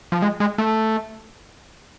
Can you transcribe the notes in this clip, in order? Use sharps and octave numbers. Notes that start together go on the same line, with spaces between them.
F3
G#3
G#3
A3